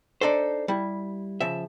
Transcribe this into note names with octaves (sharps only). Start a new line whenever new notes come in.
D4 D#4 A4 C5
G3 E4
C#3 F3 E5